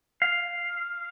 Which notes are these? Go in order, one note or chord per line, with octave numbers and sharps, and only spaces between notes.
F5